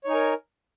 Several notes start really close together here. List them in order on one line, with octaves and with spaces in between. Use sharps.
C#5 D#4 G#5 A#4